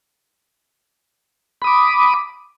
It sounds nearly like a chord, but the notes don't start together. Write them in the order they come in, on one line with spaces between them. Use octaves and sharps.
B5 D#6 D6